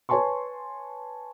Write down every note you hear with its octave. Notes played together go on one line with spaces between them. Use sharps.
B4 C#5 G#5 A5 C6 C#6